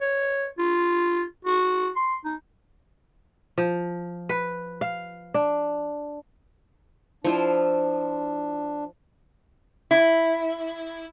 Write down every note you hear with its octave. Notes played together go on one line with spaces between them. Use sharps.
C#5
F4
F#4
C6
D#4
F3
B4
F5
D4
F3 D4 E4 F4
E4